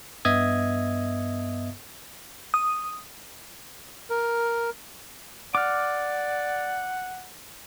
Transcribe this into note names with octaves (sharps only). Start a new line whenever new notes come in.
G2 B3 D#5 E5 D#6 G#6
D#6
A#4
D5 F#5 D6 F6